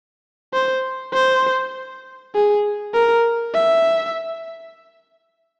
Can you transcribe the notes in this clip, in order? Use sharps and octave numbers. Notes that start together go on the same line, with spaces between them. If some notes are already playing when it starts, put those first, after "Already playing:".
C5
C5
G#4
A#4
E5